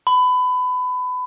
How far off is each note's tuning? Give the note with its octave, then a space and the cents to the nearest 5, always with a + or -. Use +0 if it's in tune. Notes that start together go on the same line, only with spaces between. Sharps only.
B5 +25